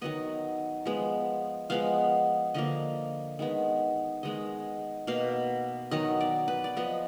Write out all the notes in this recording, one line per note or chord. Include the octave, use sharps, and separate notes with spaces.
D#3 F#3 B3 D#5
F3 G#3 B3
F3 G#3 B3 F5
D3 F3 A#3 D#5
D#3 G#3 B3
D#3 G#3 B3 D#5
B2 A#3 F5
D#3 F#3 B3 D#5
D5
B4
D5
F3 B3 D#5